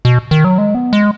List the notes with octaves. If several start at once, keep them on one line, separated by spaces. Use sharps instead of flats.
B2
D#3
F#3
G#3
B3
G#3